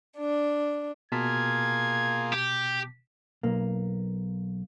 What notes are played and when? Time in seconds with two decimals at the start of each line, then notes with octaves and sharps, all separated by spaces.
0.17 D4
1.12 B2 A#3 F4 G#4 A5 G#6 B6
2.33 G4
3.43 B1 A#3